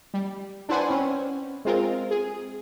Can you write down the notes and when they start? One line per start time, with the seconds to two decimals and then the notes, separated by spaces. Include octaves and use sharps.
0.14 G3
0.69 D4 E4 B4 C5 F#5 G#5
0.89 C4 C#4
1.65 G#3 C4 F4 A#4
2.11 G#4